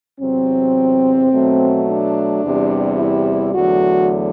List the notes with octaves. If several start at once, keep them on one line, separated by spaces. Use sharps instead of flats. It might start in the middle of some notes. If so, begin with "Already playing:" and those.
E2 C3 F#3 C4
B2 F#3 A3
D4
E2 C3 G3
E4
E2 D3 F#3 A3 F#4